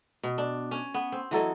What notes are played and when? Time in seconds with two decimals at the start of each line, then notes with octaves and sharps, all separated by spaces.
0.23 B2
0.38 D4
0.71 C#4
0.94 B3
1.12 C4
1.31 E3 F#3 A4 D#5